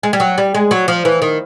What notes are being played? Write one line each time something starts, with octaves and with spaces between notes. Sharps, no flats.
G#3
G3
F#3
G3
G#3
F#3
F3
E3
D#3